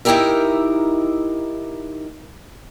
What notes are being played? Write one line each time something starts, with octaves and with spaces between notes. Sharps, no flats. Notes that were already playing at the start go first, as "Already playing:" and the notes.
D#4 E4 F#4 G4 A#4 E5